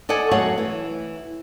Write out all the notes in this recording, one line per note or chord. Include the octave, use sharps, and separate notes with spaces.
A4 D5 D#5 F#5 G#5
F#2 A3 F#4 G#4 C#5 F#5
E3